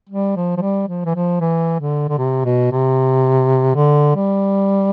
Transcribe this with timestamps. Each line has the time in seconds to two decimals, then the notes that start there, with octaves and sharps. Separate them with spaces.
0.09 G3
0.36 F3
0.57 F3
0.61 G3
0.88 F3
1.05 E3
1.15 F3
1.41 E3
1.80 D3
2.09 D3
2.18 C3
2.45 B2
2.72 C3
3.75 D3
4.16 G3